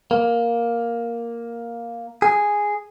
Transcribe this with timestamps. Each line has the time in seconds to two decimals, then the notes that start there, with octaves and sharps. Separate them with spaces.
0.11 A#3
2.22 G#4